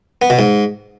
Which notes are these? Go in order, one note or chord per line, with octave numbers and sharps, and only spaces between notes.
B3
B2
G#2